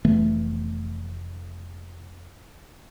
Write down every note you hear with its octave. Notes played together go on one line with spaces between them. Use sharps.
F1 E3 A3 B3